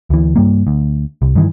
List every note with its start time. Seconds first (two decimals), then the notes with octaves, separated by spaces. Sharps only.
0.10 D2 E3
0.36 G2 G3 A#3
0.67 D2
1.22 C2
1.36 G2 D#3 E3